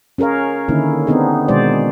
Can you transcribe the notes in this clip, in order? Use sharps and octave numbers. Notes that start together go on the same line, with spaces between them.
C#4 G#4 A#4 C#5 F5
D3 D#3 A#3 C#4 D#4 E4
B3 C4 D4 D#4 G#4
B2 D#3 G#3 F#4 C5 D5